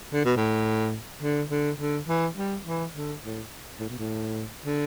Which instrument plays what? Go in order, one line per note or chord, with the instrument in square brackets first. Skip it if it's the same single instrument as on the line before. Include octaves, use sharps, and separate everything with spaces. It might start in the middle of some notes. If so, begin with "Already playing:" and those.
[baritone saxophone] D3
B2
A2
D3
D3
D3
E3
G3
E3
D3
A2
A2
B2
A2
D3